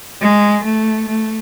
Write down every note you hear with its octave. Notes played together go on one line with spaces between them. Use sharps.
G#3
A3
A3